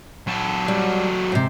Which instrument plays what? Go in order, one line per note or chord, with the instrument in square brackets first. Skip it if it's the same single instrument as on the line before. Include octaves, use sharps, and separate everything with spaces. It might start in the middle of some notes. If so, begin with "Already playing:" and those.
[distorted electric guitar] F#3 A4
[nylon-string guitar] G3
G#2 C3